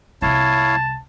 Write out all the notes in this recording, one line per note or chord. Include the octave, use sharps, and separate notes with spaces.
C2 E4 F4 C#5 F5 A5